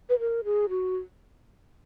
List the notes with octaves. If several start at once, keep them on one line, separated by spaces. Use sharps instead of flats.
B4
A#4
G#4
F#4